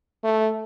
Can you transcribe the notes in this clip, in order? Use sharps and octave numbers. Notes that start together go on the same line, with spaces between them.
A3